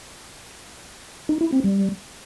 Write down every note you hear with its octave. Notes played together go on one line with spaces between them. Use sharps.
D#4
E4
C4
G3